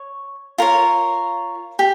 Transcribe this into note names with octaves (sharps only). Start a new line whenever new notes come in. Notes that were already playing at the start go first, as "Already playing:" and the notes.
Already playing: C#5
F4 A#4 C#5
G4